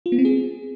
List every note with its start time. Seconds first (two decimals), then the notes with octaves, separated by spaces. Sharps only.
0.06 F4
0.12 B3
0.18 C4
0.25 G#4